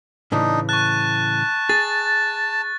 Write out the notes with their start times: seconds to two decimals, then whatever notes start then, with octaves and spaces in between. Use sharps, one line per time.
0.32 A2 C#3 E3 D4 D#4
0.69 A5 C#6 F#6
1.69 G#4 A6